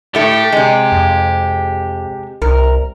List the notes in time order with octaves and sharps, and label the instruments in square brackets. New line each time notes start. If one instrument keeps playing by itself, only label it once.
[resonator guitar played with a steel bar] A2 A3 [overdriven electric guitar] G4
[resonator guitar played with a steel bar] C3 G#3
[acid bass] F2
[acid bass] C2 [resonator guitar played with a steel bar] A#4